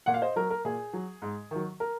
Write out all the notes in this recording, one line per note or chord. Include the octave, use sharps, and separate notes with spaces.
A#2 F#5
F5
C5 D#5
F#3 A#4
A#4
A#2 G#4
F#3
G#2
D#3 F#3
A#4